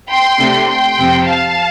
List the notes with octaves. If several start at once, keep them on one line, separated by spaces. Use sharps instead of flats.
G5 C6
C3 A3 D4
G5 C6
F2 C3 F3 C4
F5 A5